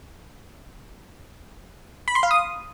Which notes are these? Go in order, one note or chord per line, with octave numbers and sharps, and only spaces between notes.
B5
C6
F5
D#6